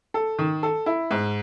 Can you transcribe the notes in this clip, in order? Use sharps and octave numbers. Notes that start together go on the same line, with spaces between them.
A4
D#3
A4
E4
G#2